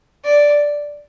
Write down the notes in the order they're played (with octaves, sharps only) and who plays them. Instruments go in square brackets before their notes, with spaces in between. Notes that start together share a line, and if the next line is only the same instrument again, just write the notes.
[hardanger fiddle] D5